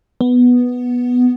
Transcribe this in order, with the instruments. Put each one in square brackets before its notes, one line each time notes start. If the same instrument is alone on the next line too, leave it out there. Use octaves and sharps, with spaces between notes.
[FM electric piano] B3